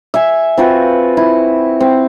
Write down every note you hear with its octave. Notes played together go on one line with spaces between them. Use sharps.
E5 G#5
C4 F4 F#4 B4
E4
C4